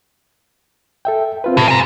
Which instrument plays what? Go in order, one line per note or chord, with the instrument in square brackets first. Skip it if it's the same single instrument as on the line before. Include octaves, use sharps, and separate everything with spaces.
[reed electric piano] A4 E5 G5
C4 F4 B4
[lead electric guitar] A2 [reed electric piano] C3
[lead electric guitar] G#5 A#5